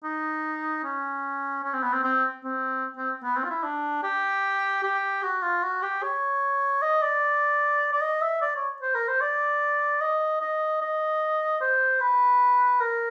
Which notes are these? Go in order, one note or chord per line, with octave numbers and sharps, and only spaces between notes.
D#4
C#4
C#4
C4
B3
C4
C4
C4
C4
B3
C4
F4
E4
D4
G4
G4
F#4
F4
F#4
G4
C#5
D#5
D5
D5
D#5
E5
D5
C#5
C5
A#4
C5
D5
D#5
D#5
D#5
C5
B4
A#4